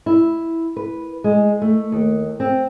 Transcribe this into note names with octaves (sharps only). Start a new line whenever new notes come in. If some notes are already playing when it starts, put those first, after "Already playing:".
E4
B4
G#3
A3
D#2
C4